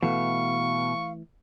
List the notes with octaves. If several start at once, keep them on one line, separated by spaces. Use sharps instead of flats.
B2 E3 A3 F5 C#6